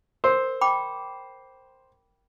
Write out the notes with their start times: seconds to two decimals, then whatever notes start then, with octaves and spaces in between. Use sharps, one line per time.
0.24 A#4 C5
0.61 G5 B5 D6